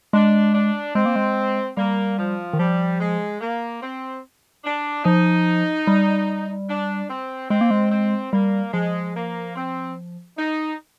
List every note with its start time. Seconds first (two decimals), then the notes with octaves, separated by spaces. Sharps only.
0.13 G#3 D4
0.54 D4
0.95 G#3 C4
1.06 A#3
1.16 G#3
1.77 G3 A#3
2.18 F3
2.53 D#3
2.59 F3 G3
3.00 G#3
3.41 A#3
3.82 C4
4.65 D4
5.05 F3 D#4
5.87 G3
6.69 D4
7.09 C4
7.50 G#3 C4
7.61 A#3
7.71 G#3
7.91 C4
8.33 G3 A#3
8.74 F3 G#3
9.15 A#3
9.56 C4
10.38 D#4